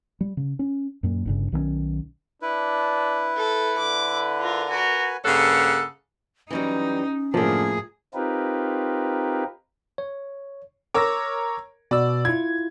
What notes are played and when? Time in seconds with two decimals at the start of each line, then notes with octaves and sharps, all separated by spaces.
0.21 G3
0.37 C#3
0.59 C#4
1.03 F#2 A#2
1.26 G1 G2 C#3
1.52 B1 D#3 F#3 C#4
2.42 D4 E4 B4
3.36 A4
3.77 D3 D6
4.40 F4 A#4
4.70 F#4 A#4 B4 G#5
5.24 G2 C#3 A#3 C#4 A4 F#5
6.50 E3 F#3 G3 C#4 D#4
7.34 F#2 A2 D3 F3 A#3 G#4
8.14 C4 D#4 F4 G4 A#4 B4
9.98 C#5
10.94 A#4 C#5 D6 E6 A#6
11.91 B2 D5 E6
12.25 E4 F4 G#6